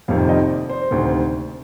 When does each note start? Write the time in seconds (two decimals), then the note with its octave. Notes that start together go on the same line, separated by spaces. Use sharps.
0.08 F1 F2 C3 D#3 F5
0.29 D#5
0.49 D5
0.70 C5
0.91 D2 C3 D#3